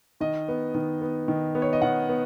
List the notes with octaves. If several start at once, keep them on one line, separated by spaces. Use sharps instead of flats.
D#3 D#5
B3
D#3
B3
D#3
B3
C#5
D#5
D#3 F#5
B3